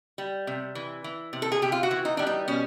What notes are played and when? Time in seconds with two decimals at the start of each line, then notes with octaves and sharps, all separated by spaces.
0.18 G3
0.47 C3
0.75 E3
1.04 E3
1.33 C3
1.42 A4
1.52 G#4
1.62 C3 G4
1.72 F4
1.83 F#4
1.91 E3
2.05 D#4
2.17 G3 D4
2.27 D#4
2.48 B2 C#4